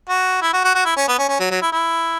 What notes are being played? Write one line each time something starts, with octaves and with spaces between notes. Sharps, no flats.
F#4
E4
F#4
F#4
F#4
E4
C#4
B3
C#4
C#4
F#3
F#3
E4
E4